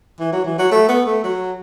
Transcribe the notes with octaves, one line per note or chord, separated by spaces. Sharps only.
E3
F#3
E3
F#3
A3
B3
A3
F#3